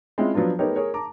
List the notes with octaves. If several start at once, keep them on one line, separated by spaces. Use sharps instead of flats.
G#3 C4 C#4 E4 F4
F3 F#3 B3 D4 F4
A3 B3 D#4 G4 A#4 C#5
G#4 A#4 C#5
A5 A#5 D6